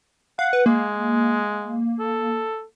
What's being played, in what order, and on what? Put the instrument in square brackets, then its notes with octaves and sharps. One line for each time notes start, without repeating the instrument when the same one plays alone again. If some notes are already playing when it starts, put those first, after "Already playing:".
[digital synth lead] F5 [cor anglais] F#5
[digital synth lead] B4
[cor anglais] G#3 [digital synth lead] A#3
[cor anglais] A4